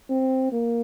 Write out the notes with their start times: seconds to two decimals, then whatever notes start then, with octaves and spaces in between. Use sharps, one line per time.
0.10 C4
0.52 A#3